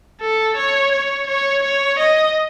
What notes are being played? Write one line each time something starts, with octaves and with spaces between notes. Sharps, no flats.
A4
C#5
C#5
C#5
C#5
D#5